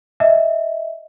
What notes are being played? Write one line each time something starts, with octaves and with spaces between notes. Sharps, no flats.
D#5 E5